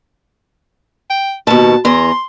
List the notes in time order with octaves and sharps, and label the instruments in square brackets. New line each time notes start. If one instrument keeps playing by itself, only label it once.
[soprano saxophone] G5
[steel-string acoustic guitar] D#2 B2 [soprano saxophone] A5
[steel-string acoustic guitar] E2 A#5 [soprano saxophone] C6